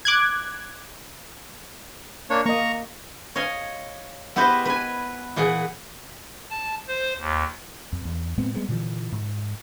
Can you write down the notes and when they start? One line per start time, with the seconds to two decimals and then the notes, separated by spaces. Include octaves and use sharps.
0.05 D6 F#6 G#6
2.30 A#3 D4 C#5
2.46 A#3 D#5 A#5 C#6
3.36 C#5 D#5 F5 G#5
4.36 B3 E4 G4 B4 C5 D#5
4.65 B4 G#5
5.36 A#2 E3 G#4 F#5
6.51 A5
6.88 C5
7.18 D#2
7.93 F2
8.05 E2
8.38 A2 G#3 B3 C4
8.55 G3 G#3 B3
8.69 A#2 D3 E3 F3
9.12 G#2